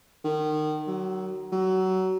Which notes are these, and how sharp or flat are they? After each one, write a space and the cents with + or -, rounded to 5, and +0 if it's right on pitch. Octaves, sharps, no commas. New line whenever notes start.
D#3 -25
F#3 +20
F#3 +20